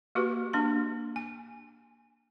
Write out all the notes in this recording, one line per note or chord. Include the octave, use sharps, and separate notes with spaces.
A#3 F#4 G4 B4
A#3 D4 C6
G#5